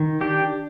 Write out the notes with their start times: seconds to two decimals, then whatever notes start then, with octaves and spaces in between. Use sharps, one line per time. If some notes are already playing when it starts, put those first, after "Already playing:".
Already playing: D#3
0.21 D4 G4